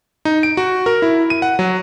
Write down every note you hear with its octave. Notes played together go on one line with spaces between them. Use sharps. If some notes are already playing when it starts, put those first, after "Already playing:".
D#4
D7
F#4
A#4
E4
D#7
F#5
F#3